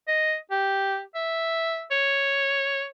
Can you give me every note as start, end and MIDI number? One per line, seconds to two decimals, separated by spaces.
0.08 0.35 75
0.51 1.01 67
1.15 1.84 76
1.91 2.85 73